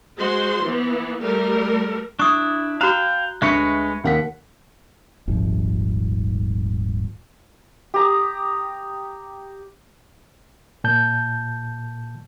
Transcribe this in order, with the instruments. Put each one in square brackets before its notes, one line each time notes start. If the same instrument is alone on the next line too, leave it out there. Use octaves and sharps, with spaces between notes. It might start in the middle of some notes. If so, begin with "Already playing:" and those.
[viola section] G#3 F#4 C5 C6
E3 B3
G3 A3 A#4
[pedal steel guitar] D4 E4 [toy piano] C#6 D#6
[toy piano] F#4 A#5 [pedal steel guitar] F5 G5 [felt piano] F#6
[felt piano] D2 C#7 [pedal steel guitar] G#3 B4 C#5 [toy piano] E5 C#6
[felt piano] D#2 F#5 B6
[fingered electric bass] D#1 G#1 F3
[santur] G4 A#5 D#6
[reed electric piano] A#2 A5 G6